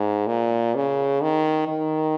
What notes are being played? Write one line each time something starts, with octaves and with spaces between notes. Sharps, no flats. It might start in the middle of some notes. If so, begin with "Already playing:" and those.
Already playing: G#2
A#2
C#3
D#3
D#3